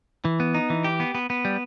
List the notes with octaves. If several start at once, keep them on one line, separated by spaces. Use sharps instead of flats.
E3
B3
D#4
E3
G4
B3
B3
B3
G3